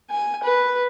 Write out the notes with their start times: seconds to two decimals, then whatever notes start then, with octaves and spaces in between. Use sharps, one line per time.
0.10 G#5
0.43 B4